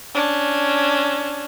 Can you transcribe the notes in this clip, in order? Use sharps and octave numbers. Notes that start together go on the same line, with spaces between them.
C#4 D4